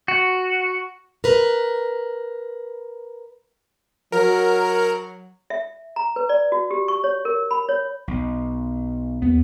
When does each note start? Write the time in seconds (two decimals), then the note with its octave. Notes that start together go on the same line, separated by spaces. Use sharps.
0.08 F#4
1.24 A#4 B4
4.12 F#3 A#4
5.50 E5
5.96 A#5
6.16 B4
6.29 D5
6.52 F#4
6.71 G4
6.88 C#6
7.04 C#5
7.25 A#4
7.51 B5
7.69 C#5
8.08 B1
9.22 D#2 B3